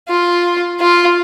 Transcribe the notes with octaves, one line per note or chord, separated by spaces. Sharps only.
F4
F4